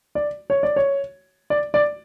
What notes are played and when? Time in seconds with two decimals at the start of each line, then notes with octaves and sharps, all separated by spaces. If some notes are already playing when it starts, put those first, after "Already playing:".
0.15 D5
0.50 C#5
0.63 D5
0.76 C#5
1.50 D5
1.74 D5